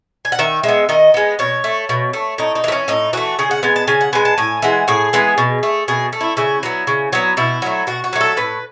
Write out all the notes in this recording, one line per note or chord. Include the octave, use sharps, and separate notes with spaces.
G#5
F#5
D#3 E5
G#3 B3 E5
D#3 D#5
G#3 B3
B2 C#5
A3
B2
A3
A2 D#4
D#4
E3 A3
C#4
A2 D#4
E3 A3 F#4
C#3 G#4
F#5
G#3 B3 G#5
A5
C#3 G#5
F#5
G#3 B3 G#5
A5
A2 G#5
E3 G#3 F#5
A2 G#4
E3 G#3 B3
B2
A3
B2 G#4
A3
E4
C#3 E4
F#3 B3
C#3
F#3 B3
B2 E4
F#3 A3
B2 F#4
F#4
F#3 A3
A4
A2 B4